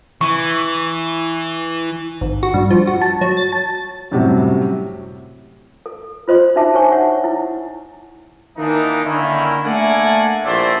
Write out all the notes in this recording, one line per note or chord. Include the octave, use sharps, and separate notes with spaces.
E3 C#6
G#1
F#4
G2
F3
F#4
A5
F#3
A6
A5
F#2 A2 C3 F#3 G3
A4
F4 C5 D#5 C6
D4 D#4 F#4 E5 A5 D6
D#4 C5 C#5 G#5 C#6
D#4 C#5 E5 F#5
E4
D#3 E3 A#3 D4 D#4
D3 D#3 A#3 C#4 E4
A3 A#3 D4 D5 F#5 G#5
A#1 A2 D4 C5 D5 E5